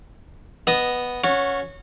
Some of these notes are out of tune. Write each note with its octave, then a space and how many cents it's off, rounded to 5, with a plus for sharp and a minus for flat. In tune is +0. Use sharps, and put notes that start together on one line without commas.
B3 +0 D#5 +0 D#6 +0
C#4 +0 F#4 -20